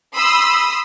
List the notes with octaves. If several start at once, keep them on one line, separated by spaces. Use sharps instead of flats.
B5 C6 D#6 E6